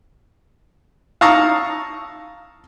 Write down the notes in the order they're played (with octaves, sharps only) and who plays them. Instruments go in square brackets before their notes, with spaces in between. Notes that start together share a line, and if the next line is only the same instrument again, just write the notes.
[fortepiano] F5 A5 A#5 C#6 D#6 E6